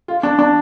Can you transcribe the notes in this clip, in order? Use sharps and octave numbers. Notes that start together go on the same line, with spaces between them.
F4
D4
D4